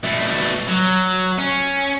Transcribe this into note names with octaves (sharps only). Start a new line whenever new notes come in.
B2 A3
F#3
C#4